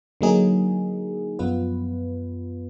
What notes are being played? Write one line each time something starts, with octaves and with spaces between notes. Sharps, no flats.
D3 F#3 A#3 D#4 G#4
F#2 F3 B3 F4 B4